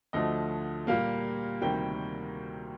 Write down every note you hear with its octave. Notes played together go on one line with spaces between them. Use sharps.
D2 D3 F3 A3 D#5
A#2 G3 A#3 F5
D2 C3 D#3 G3 A#3 G5